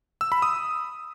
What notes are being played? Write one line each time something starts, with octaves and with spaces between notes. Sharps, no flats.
E6
B5
D#6